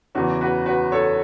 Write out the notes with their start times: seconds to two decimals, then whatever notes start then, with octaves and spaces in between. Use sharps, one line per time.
0.15 E2 C#3 E3 F#4
0.41 F#4 B4
0.66 F#4 B4
0.92 A4 C#5